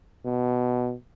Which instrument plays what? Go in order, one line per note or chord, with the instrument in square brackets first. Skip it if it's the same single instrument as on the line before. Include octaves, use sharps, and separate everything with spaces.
[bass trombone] B2